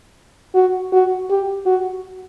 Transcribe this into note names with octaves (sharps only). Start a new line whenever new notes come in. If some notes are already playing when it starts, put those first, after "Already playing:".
F#4
F#4
G4
F#4